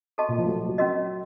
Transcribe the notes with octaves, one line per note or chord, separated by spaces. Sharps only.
F#4 A4 D#5 A5 C#6
A#2
F3
A3
F#3
F#3
C#4 F#4 A#4 D#5